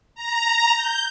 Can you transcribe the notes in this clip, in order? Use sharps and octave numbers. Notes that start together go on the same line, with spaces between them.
A#5
G6